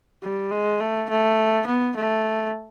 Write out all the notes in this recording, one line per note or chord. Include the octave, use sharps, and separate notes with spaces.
G3
G#3
A3
A3
B3
A3